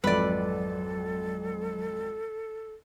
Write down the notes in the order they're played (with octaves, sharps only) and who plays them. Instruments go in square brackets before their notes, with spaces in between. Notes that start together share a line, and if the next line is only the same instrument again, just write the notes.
[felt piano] G#1 F2 [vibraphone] F#3 [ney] A4 [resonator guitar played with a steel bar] B4 D5